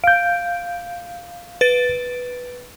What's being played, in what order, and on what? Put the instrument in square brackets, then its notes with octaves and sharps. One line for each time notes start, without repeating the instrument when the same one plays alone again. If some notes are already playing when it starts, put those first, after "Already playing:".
[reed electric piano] F5 G6 [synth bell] D7
[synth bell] B4 A6 D7